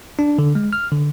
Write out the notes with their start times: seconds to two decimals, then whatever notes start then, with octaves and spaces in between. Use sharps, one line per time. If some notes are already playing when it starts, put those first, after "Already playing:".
0.19 D4
0.39 D3
0.55 G#3
0.73 F6
0.92 D3